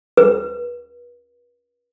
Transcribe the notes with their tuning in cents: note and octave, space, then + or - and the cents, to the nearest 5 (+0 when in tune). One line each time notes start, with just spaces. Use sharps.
B4 -40